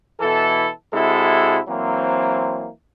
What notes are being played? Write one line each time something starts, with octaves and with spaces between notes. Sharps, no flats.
B2 E3 E4 A4
C3 G#3 E4 F#4 A4
E3 F#3 A#3 C4